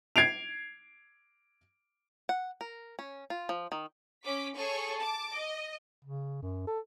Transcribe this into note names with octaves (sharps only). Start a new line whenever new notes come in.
G#6 C7 D7 F7
F#5
A#4
C#4
F4
F3
D#3
C#4 D6 B6
G#4 A4 C#5 C#6
A5 D6
D#5
C#3
F#2
A4